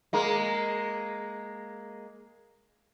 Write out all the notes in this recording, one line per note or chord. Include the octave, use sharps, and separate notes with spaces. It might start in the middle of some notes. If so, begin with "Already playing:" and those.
G#3 A#3 A#4